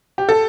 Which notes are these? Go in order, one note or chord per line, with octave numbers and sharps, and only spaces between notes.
G4
A4